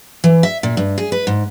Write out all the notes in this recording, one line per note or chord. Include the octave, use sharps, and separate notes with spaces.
E3
E5
A#2
G2
G#4
B4
G#2